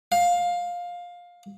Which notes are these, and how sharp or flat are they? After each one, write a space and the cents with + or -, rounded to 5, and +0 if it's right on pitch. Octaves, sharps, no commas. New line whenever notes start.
F5 +15